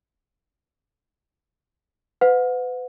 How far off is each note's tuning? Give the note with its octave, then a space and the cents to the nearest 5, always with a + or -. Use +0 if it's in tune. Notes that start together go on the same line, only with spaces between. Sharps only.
B4 +35 F#5 -35